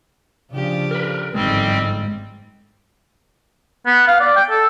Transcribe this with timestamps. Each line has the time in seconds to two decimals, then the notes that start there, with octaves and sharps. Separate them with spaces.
0.52 C#3 F3 D4 F4 G4
0.91 A#4 B4
1.34 G1 F2 G#2 D#3 G3 G#3 C4
3.86 B3
4.07 F5
4.20 D5
4.36 G5
4.50 A4